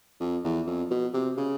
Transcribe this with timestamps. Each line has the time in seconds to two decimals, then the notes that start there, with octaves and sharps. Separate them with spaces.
0.20 F2
0.44 E2
0.67 F2
0.91 B2
1.14 C3
1.37 C#3